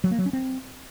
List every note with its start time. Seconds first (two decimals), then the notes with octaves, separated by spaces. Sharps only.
0.04 F#3
0.11 A#3
0.18 F#3
0.26 C#4
0.33 C4